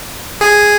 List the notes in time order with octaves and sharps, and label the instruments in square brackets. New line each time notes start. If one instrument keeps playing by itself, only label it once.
[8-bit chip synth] G#4